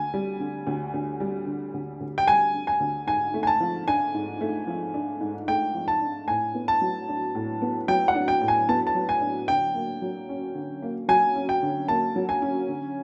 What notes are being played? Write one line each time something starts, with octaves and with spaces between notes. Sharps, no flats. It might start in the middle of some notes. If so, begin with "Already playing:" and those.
Already playing: D2 G#5
G3
D3
D2
D2
G3
D3
D2
D2
G5
G3 G#5
D3
G#5
D2
G#2 G#5
A3
G#5
A5
F3
D4 G#5
G#2
A3
F3
D4
G#2
A3 G5
F3
A5
D4
A2 G#5
B3
A5
F#3
D4
A2
B3
F#3 G5
F#5
D4
G5
A2
G#5
B3 A5
A5
F#3
G#5
D4
D3 G5
A#3
F#3
C#4
D3
A#3
F#3 G#5
C#4
G5
D3
A#3 A5
F#3
G#5
C#4
D3